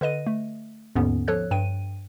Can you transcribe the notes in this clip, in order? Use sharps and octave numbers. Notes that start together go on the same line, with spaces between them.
D3 B4 D#5 D#7
A3
D#2 G#2 D3 B3 C#4
F3 A4 C#5 F#6
G2 G5 D#7